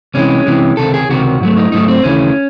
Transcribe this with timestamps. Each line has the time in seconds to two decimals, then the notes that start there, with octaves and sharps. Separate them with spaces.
0.14 C2 C3 E3 G#3 C#4
0.46 C2 C3 E3 G#3
0.77 C#2 C3 D#3 A4
0.94 G#4
1.09 C#2 C3 D#3 F#4
1.41 G#2 F#3 A3
1.57 D#4
1.72 G#2 F#3 A3 D#4
1.88 C4
2.04 D#2 C#3 E3 A3 C#4